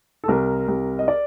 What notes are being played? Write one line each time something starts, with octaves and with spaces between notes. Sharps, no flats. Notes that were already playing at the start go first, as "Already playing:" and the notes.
A4
C2 A#4
C2
D#5
D5